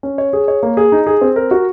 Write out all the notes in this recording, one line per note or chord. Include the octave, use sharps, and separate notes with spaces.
C#4
C#5
G#4
C#5
A#3
G#4
D#4
G#4
C4
A#4
F#4